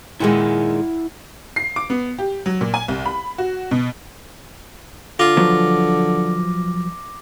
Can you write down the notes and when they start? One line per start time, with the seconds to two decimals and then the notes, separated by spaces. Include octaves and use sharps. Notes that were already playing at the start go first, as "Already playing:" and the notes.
0.20 A#2 D#3 G#3 E4 F#5 G#5
1.56 C7
1.76 D6
1.90 B3
2.19 G4
2.46 F#3
2.61 A#2
2.74 G#5
2.88 C2
3.06 B5
3.38 F#4
3.71 B2
5.19 D3 F4 D6 A#6
5.37 F3 F#3 B3